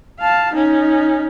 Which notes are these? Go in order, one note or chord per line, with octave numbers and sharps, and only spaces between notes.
F5 A5
C#4 D#4